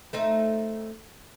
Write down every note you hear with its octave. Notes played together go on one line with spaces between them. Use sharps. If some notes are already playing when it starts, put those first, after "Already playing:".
A3 C4 D#4